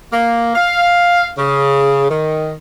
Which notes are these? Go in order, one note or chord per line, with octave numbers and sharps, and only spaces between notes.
A#3
F5
C#3
D#3